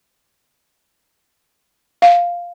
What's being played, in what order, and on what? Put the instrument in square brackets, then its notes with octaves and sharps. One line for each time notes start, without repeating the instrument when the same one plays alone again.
[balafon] F5